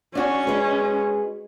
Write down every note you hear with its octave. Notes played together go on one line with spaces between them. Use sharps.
C#4 D4 F#4 G#4
G#3 F#4 G#4 B4